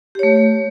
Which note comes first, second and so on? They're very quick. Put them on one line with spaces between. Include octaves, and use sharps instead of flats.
G4 C#5 A3